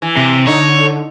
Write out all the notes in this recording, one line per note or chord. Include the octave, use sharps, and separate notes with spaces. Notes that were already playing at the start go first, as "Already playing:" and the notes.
E3
C3
D3 D#4 C#5